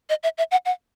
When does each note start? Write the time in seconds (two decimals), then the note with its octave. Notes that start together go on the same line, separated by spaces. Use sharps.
0.09 D#5
0.23 E5
0.38 E5
0.51 F#5
0.65 F#5